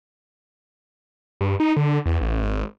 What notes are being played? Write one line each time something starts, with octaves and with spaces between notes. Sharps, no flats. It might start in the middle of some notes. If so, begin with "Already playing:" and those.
G2
D#4
D3
E2
A1
G#1